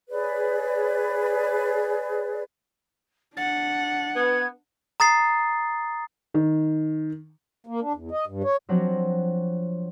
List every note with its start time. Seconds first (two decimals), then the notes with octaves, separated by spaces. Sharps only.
0.09 G#4 B4 C#5 D5
3.36 D4 F#5 A6
4.15 B3 G#6
5.00 A#5 D#6 A6 C7
6.34 D#3
7.67 A#3
7.81 D4
7.94 E2
8.11 D#5
8.27 G2
8.44 C#5
8.69 F3 F#3 C4 D4 F#4